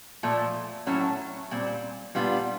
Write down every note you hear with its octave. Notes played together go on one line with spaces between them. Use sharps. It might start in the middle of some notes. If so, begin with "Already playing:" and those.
A#2 F3 A3
A2 F#3 A3 C#4 E4
A#2 G3 C4
A#2 G3 B3 D4 F4